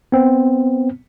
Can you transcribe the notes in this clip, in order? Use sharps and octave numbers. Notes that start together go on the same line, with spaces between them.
B3 C4